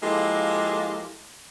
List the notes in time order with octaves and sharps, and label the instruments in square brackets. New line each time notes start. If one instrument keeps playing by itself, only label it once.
[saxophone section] F3 G#3 A#3 E4 G4 A4